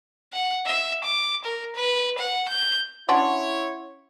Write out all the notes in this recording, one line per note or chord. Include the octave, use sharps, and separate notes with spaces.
F#5
E5
D6
A#4
B4
F#5
G6
C#4 D4 E4 F#4 C#5 F#5 C6